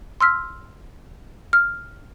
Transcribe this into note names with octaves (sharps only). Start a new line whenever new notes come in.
C6 E6 F6 B6
F6